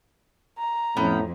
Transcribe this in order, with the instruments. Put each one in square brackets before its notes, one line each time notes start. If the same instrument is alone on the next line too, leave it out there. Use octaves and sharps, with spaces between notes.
[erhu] A#5
[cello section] F2 [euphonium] A2 [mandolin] B3 C#4 G5